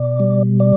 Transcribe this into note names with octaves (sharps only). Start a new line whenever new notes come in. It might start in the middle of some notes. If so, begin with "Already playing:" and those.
Already playing: B2 D5
G3
D5